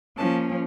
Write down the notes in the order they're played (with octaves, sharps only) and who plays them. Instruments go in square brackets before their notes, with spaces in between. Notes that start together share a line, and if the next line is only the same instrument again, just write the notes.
[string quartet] F3 A#3 C#4 A5